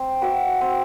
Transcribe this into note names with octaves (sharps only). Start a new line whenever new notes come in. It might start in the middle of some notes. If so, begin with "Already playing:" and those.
Already playing: C4
F#4 B4 E5
C4